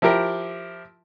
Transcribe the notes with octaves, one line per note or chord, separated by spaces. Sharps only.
F3 E4 G4 A#4